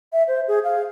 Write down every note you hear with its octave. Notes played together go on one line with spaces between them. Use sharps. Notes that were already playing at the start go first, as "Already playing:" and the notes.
E5
C5
G#4
F5